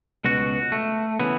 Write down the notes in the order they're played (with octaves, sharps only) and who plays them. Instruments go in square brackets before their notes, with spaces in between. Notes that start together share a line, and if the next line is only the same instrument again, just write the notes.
[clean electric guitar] C#2 B2 F#4
A3
C#3 E3 B3